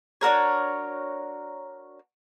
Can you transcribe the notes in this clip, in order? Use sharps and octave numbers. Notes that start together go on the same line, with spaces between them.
D4 F#4 A#4 C#5